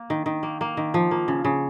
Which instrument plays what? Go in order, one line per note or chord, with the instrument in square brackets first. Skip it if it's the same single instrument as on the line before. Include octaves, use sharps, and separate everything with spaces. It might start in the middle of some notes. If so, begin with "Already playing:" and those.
Already playing: [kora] A#3
D#3
D#3
A#3
A#3
D#3
F3
A#3
C#3
C#3